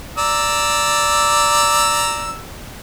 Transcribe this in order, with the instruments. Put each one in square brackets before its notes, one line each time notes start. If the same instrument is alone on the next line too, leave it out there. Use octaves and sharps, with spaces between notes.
[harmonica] D5 A#5 E6